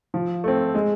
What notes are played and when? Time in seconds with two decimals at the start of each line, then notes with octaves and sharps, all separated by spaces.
0.14 F3
0.44 A3 C4
0.75 G#3